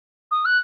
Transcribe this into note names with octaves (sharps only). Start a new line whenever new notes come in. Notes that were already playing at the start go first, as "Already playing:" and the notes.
D#6
F#6